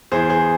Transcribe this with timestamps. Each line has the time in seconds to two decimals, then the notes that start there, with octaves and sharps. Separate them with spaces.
0.11 E2 E3 G#4 C5
0.29 G#4 C5